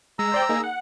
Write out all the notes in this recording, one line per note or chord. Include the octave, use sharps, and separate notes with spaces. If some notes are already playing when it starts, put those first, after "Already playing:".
G#3 A#5 E6
C5 D5 G5
A#3 D#4 G#4
F#5